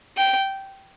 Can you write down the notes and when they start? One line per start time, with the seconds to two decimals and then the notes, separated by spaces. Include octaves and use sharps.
0.17 G5